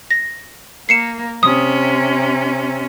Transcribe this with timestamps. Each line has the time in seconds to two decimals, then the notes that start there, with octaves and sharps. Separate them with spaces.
0.11 A#6
0.89 A#3 C7 C#7 E7
1.43 C3 C#4 D#6